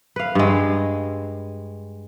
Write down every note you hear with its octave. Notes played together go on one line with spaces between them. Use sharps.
B4 F5
G2 G#3